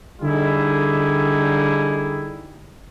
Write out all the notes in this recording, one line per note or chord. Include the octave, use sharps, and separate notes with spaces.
D3 G3 D#4 E4 G#4